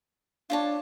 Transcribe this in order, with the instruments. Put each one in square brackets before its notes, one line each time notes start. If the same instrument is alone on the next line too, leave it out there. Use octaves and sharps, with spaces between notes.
[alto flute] D4 [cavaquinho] F4 C#5 A5